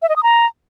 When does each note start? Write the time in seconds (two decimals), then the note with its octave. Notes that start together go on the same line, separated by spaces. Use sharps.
0.02 E5
0.09 D#5
0.16 D#6
0.23 A#5